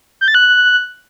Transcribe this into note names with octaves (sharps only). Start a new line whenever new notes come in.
G6
A6
F#6